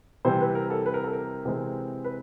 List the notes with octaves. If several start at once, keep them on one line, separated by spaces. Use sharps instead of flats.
C3 E3 G3 C4 C5
B4
A#4
A4
B4
A#4
A4
A#4
C3 E3 G#3 C4
B4